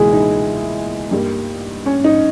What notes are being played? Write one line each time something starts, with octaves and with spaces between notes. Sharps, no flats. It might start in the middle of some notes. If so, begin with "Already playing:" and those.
Already playing: C#2 B2 E3 G#3 A#3 E4 G#4
D#4
G2 G3 A#3
C#4
D#4